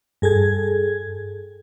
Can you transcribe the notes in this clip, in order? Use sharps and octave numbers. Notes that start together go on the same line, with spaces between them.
G2 G#4 A4 G#6